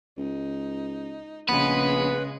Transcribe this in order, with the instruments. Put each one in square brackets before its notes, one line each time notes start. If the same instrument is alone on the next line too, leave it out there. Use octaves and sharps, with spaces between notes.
[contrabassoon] C#2 [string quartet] D#4
[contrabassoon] A#1 [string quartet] C#3 G#3 G#4 [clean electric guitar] B3 [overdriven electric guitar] B4